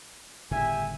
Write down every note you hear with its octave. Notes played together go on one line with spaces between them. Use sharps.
G1 A2 C#3 G4 E5 G#5